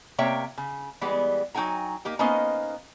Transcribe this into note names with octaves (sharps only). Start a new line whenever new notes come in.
C3 A#3 C#5 E5 G5
C#3
E3 G3 G#3 B3
F#3 D#4 G5 G#5 A#5
A#3 D#4 G4
A#3 B3 C#4 D#4 C5 D#5